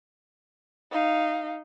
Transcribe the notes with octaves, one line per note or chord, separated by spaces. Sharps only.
D#4 F5